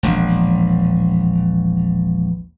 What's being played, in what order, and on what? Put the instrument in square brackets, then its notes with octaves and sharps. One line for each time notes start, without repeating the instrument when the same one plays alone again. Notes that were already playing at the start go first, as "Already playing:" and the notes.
[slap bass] E1 A#1